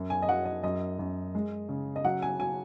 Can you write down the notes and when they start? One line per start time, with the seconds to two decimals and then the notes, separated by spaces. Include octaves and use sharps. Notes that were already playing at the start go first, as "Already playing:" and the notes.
Already playing: F#2 F#3
0.10 G#5
0.22 D#5
0.28 F#3 F#5
0.45 D#5
0.63 F#2 D#5
0.99 F#2
1.35 G#3
1.69 C#3
1.96 D#5
2.04 F#3 F#5
2.22 G#5
2.40 F#3 G#5